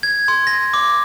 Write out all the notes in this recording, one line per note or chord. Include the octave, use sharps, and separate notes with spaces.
G#6
C6
A#6
D6